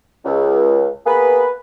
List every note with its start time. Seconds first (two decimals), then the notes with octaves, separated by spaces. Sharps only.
0.25 C#2
1.06 A#3 B3 G#4 B4